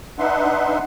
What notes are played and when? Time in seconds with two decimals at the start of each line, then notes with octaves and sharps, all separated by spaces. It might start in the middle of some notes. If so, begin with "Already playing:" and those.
0.19 D4 D#4 B4 E5 F#5 C6